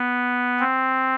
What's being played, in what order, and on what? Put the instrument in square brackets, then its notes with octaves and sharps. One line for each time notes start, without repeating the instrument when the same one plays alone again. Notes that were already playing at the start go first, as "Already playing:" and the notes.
Already playing: [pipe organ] B3
C4